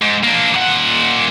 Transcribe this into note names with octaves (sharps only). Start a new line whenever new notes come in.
G#2
A#3 D4
A#2 F#5